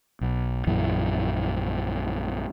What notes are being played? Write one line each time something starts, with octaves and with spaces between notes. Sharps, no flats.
B1
A#1 F#2 E3